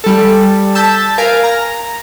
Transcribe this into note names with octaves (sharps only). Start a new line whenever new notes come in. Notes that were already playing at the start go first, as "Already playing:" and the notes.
G3 A4
A5 E6 G6 A6 B6
A#4 F5 G#5 D7
A#5